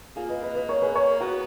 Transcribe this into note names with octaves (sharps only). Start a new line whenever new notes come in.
A#3 F4 G#4
B4 D#5
B4 D#5
B4 D#5
A#4 C#5
G#4 B4
A#4 C#5
B3 F#4 A#4